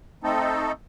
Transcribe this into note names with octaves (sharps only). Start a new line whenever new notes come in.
A3 C4 D#4 A4